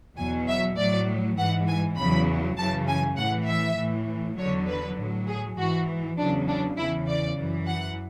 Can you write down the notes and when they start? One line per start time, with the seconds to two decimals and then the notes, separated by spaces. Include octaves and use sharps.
0.17 E2 B2 F#3 G#5
0.48 E5
0.78 A2 F#3 D5
1.38 G#2 E3 F#5
1.68 G#5
1.98 E2 C#3 F#3 B5
2.58 F#2 C#3 E3 A5
2.88 G#5
3.17 A2 E3 F#5
3.48 E5
3.78 A2 E3
4.38 E2 D3 F#3 C#5
4.67 B4
4.98 A2 F#3
5.28 G#4
5.57 G#2 E3 F#4
6.18 E2 C#3 F#3 D4
6.48 D4
6.78 E2 C#3 E3 E4
7.08 D5
7.38 F#2 E3
7.67 F#5